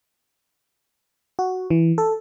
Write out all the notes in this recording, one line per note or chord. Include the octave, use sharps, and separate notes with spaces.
F#4
E3
A4